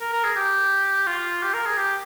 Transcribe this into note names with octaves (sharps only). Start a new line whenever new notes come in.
A#4
A#4
G#4
G4
F4
G4
A#4
G#4
G4